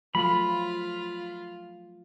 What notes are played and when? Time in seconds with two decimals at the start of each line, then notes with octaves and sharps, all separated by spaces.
0.15 F3 F#3 A3 F4 B5